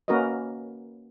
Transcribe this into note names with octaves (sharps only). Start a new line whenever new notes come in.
A#3 C#4 F#4 A#4 B4 D#5